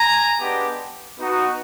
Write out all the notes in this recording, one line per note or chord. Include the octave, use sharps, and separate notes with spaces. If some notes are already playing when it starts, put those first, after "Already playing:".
Already playing: G#5 A#5
G#3 B3 D4 G4
B3 D#4 F#4